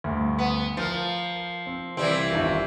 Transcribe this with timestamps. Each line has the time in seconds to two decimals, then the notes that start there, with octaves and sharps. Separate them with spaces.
0.04 D2 G2
0.39 B3
0.77 F3 A#4 F6 A6
1.66 C4
1.97 C2 E3 G3 C4
2.30 G1 D#3 F4